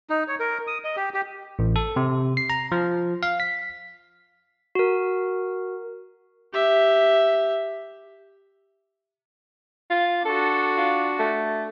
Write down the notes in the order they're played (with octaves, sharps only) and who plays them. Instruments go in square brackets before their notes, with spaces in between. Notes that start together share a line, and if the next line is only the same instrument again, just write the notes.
[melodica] D#4
C#5
A#4
D#6
D#5
G4
G4
[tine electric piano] A1
A4
C3
C7
A#5
F3
F5
B6
[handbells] F#4 A#4
[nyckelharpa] G4 E5
[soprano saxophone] F4
[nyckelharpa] D4 F#4 [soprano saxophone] A4
[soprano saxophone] F4
A3